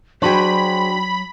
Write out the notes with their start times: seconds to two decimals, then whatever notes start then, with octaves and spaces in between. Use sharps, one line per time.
0.22 F#3 D4 F#4 G#4 C5 G5 B5